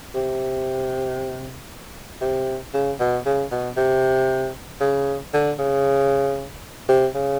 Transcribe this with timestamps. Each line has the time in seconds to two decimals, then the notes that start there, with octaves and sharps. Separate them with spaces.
0.15 C3
2.21 C3
2.74 C#3
3.00 B2
3.26 C#3
3.51 B2
3.77 C3
4.81 C#3
5.33 D3
5.59 C#3
6.89 C3
7.15 C#3